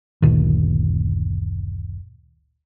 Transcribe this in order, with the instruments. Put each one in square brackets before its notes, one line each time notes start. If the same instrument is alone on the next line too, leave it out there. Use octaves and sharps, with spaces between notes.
[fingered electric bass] F#1 D2 A#2 D#3